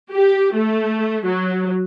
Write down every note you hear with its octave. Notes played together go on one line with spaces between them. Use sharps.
G4
A3
F#3